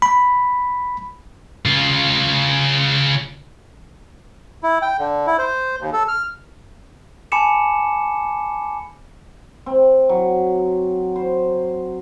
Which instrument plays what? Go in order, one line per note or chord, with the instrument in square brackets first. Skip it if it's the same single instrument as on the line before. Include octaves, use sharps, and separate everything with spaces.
[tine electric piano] B5
[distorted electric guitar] C#3 F4
[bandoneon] E4
G5
D3
E4
C5
D#2
A4
F6
[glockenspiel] G#5 A5 B5 D6 C#7 E7
[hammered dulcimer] C4
F#3
C5